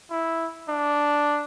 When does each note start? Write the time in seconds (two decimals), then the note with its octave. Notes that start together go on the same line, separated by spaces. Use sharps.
0.10 E4
0.69 D4